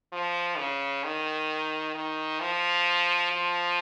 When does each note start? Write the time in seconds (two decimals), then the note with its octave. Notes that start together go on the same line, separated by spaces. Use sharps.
0.12 F3
0.58 C#3
1.04 D#3
1.95 D#3
2.40 F3
3.32 F3